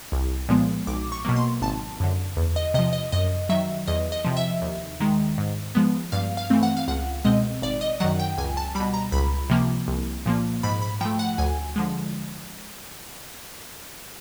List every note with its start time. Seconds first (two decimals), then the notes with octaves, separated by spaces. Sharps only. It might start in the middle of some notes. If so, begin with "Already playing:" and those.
0.12 C2
0.49 A#2 F3 G#3 B3
0.87 B1 D6
1.12 C#6
1.25 B2 F#3 A#3
1.36 C6
1.61 G#1 A5
2.00 F#2 D3
2.37 E2
2.56 D#5
2.74 C3 F3 D#5
2.93 D#5
3.12 F#2 D#5
3.49 D#3 F#3 E5
3.88 E2 D#5
4.12 D#5
4.25 C3 F3
4.37 E5
4.62 D#2
5.00 D#3 G#3
5.38 G#2
5.75 F3 G#3 B3
6.12 G2 F5
6.37 F5
6.50 E3 A3 C4
6.63 F#5
6.77 F5
6.88 C#2 F#5
7.25 B2 G#3 C4 D#5
7.62 G#1 D5
7.81 D#5
8.00 F#2 D#3 F#3 F#5
8.19 G5
8.38 C#2 G#5
8.57 A5
8.75 B2 G3 B5
8.94 A#5
9.12 C#2 B5
9.50 C3 F3 A#3
9.88 C2
10.26 A#2 F3 A#3
10.63 G#2 B5
10.82 B5
11.01 F3 A3 G5
11.19 F#5
11.38 D2 G#5
11.76 D3 F3 G#3